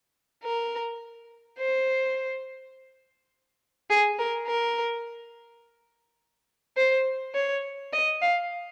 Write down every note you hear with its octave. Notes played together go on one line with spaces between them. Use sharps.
A#4
C5
G#4
A#4
A#4
C5
C#5
D#5
F5